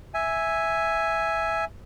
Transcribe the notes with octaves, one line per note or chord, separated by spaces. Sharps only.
E5 G#5